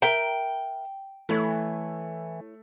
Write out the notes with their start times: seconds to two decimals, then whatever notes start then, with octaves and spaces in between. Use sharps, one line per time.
0.02 A#4 E5 G5 A#5
1.29 E3 A3 E4 C#5